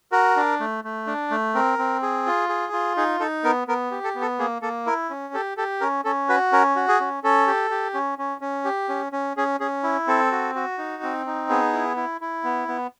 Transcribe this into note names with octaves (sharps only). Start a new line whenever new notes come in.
F#4 A#4
D4
A3
A3
D4
A3
C4 A#4
C4
G#4
F4
G#4
F4
D#4 G#4
D#4 A4
B3 A#4
B3 A#4
G4
A4
B3
A4
A#3 G#4
A#3 A4
E4 A#4
C#4
G4 A4
G4 A4
C#4 A#4
C#4 A4
F#4 B4
C#4 A#4
F#4
G#4
C#4
C#4 A4
G4
G4
C#4
C#4
C#4
G4
C#4
C#4
C#4 G#4
C#4 G#4
E4
C4 A4
F#4
F#4
D#4
C4
D#4
B3 G#4
E4
E4
E4
B3
B3